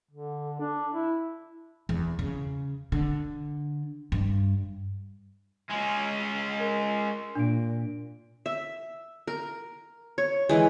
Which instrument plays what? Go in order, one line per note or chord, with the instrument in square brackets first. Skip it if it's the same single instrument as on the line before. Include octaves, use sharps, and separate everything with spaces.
[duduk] D3
D4
E4
[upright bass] E2
C#3
D3
G2
[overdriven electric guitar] G#3 C#4
[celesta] A#4
[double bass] A#2 [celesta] D4 D7
[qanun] E5
A#4
C#5
E3 G#3